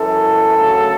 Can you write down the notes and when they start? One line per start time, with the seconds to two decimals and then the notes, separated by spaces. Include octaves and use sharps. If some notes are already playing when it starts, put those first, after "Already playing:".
Already playing: F#2 E3 A4
0.56 D2 C#3 F#3